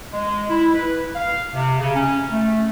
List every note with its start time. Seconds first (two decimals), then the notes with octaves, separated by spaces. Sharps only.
0.13 G#3
0.50 E4
0.74 B4
1.15 F5
1.54 C3
1.79 C#3
1.95 C#4
2.31 A3